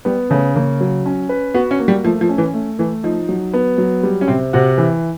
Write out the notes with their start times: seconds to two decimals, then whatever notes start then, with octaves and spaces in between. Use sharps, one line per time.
0.05 G3 B3
0.30 C#3 A3
0.56 C#3 A#3
0.81 F#3
1.06 C#4
1.29 B4
1.54 B3 F#4
1.71 C#4
1.79 A#3
1.88 G3
2.04 F3 A3
2.21 F3
2.29 C#4
2.38 E3
2.54 A3
2.79 E3 A3
3.04 F3 D#4
3.29 F#3
3.54 B3
3.78 F#3
4.03 G3
4.21 C#4
4.28 C3 C4
4.53 C3 F#4
4.78 E3